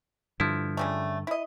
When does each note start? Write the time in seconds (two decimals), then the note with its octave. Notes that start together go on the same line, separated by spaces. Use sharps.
0.40 G2 D3 F3 E4
0.77 C#3 G3 A3
1.27 E4 D#5